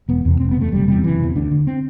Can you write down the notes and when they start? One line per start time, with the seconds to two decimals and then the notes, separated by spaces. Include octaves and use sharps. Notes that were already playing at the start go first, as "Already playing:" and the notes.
0.09 E1 B3
0.25 E2 C3
0.40 E1 C4
0.51 B3
0.56 E2 C3 A3
0.72 F#1 G3
0.88 E2 C3 G3
1.04 F#1 E3
1.19 E2 C3
1.35 D2 D4
1.51 D3
1.67 C4